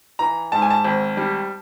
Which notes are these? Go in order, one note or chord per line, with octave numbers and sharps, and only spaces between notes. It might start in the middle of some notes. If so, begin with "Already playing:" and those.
E3 A#5
G#2 A5
G#5
A5
G#1
G3